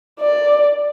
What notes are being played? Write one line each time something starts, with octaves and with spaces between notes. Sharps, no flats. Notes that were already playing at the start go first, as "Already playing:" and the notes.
D5